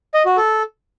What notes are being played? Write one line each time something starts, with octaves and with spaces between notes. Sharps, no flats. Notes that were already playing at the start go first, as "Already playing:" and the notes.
D#5
F#4
A4